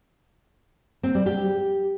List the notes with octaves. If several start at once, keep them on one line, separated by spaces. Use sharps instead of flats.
C4
G3
G4